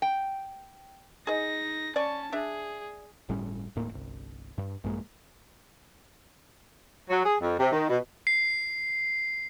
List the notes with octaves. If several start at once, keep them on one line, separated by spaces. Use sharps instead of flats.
G5
D#4 G#4 D#5 A#6
C#4 D5 A5 C#6
D4 G#4 E5
G1 A2 G3 C#4
D#1 A2 A#3
G1 C2
G2
A#1 G2 G#3 A#3
F#3
G#4
F2
C3
D#3
B2
C7